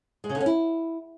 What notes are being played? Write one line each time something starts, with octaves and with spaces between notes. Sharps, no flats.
G#3
C#3
D3
C#4
E4